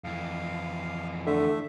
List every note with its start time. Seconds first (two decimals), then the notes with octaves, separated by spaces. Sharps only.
0.04 F2 E3 F5
1.26 D3 A3 E5